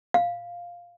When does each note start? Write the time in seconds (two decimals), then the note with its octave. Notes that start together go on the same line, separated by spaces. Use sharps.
0.14 F5